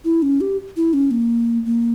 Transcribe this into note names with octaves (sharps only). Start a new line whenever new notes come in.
E4
C#4
G4
E4
C#4
A#3
A#3